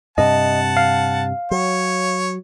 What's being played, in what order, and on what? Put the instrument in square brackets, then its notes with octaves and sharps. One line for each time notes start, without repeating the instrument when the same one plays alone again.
[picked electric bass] G2 C3 [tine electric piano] D#5 [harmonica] F#5 A5
[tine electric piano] F5
[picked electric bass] F#3 [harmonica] C#5